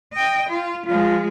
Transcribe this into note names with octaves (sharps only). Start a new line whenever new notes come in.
D#5 G5
F4
F3 G#3 F4